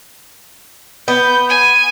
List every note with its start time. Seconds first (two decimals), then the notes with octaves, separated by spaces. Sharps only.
1.08 B3 G6
1.49 G#5